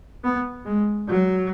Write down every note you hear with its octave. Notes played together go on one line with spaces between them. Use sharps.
B3
G#3
F#3